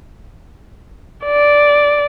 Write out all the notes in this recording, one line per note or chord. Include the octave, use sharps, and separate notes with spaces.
D5